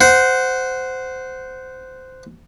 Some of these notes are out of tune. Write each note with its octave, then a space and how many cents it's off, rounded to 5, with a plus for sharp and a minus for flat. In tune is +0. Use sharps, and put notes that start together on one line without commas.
C5 -15 F#5 +0